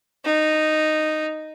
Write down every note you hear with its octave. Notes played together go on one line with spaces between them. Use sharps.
D#4